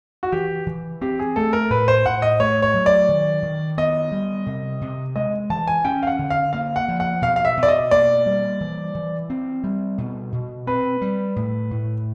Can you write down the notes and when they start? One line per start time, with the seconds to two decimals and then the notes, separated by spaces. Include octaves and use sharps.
0.23 F#4
0.32 E3 G4
0.67 E3
1.01 C4 G4
1.19 G#4
1.36 A3 A4
1.53 A#4
1.70 A2 B4
1.88 C5
2.06 A2 F#5
2.22 D#5
2.39 A3 C#5
2.62 C#5
2.74 F#3
2.86 D5
3.09 D#3
3.43 D#3
3.78 B3 D#5
4.12 G3
4.46 C3
4.81 C3
5.16 G#3 D#5
5.50 E3 A5
5.68 G#5
5.85 C#4 G5
6.03 F5
6.07 F#5
6.19 D3
6.30 F5
6.53 A#3 F5
6.76 F#5
6.88 F3
7.00 F#5
7.22 B2 F5
7.36 F5
7.45 E5
7.57 B2
7.63 D5
7.68 D#5
7.91 A#3 D5
8.26 G3
8.61 E3
8.95 E3
9.30 C4
9.64 G3
9.98 B2
10.32 B2
10.67 C4 B4
11.01 G3
11.36 A2
11.71 A2